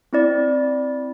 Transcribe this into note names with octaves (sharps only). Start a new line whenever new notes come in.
C4 E4 D5